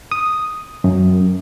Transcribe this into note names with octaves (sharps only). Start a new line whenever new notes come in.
D#6
F#2